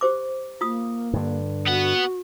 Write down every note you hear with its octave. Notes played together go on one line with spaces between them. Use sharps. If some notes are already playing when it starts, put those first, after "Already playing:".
G4 C5 D6
A#3 F4 D#6
G2 D3
B3 F#4 F#5